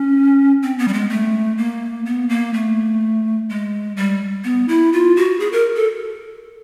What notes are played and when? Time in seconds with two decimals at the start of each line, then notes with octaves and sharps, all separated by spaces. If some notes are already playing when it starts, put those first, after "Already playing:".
Already playing: C#4
0.63 C4
0.78 B3
0.88 G3
0.93 G#3
1.09 A3
1.58 A#3
2.06 B3
2.29 A#3
2.54 A3
3.50 G#3
3.97 G3
4.44 B3
4.68 E4
4.93 F4
5.17 F#4
5.40 G#4
5.52 A#4
5.76 A4